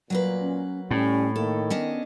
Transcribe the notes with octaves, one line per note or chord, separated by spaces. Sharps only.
A#2 F#3 A#3 B4
C#4
A2 G3 C#4
D#3 A#3 A4
B3 C#4 D4 D#5